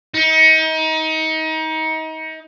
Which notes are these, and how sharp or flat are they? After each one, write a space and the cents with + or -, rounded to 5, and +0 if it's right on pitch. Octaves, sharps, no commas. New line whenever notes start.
D#4 +30